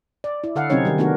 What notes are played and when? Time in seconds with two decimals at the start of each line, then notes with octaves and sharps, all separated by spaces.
0.24 D5
0.44 E4
0.56 D3 A4 F5 F#5
0.70 C3 F#3 C4 C#4 D#4 C#5
0.85 D#3 G3
0.98 D#3 A3 B3 D4 F#4 A#4